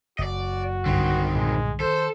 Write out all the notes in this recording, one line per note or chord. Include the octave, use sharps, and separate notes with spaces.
F#1 F#4 D5 D#5
B1 G2 D3 D#3 C4
A#2 G#3
D#3 A4 C5